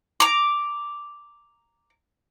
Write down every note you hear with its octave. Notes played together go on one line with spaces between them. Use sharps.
A#5 D6